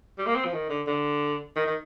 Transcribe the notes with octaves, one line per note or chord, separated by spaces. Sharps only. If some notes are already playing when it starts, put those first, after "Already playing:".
G3
A#3
C4
F3
D#3
D3
D3
D#3
D#3